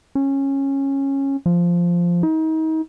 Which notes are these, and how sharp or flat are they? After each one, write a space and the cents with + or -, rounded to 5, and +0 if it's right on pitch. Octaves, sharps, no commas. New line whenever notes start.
C#4 -15
F3 -5
D#4 +35